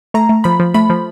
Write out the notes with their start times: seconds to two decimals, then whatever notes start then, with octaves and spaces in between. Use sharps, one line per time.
0.14 A3 A#5
0.29 A3
0.44 F3 B5
0.60 F3
0.74 A3 B5
0.90 F3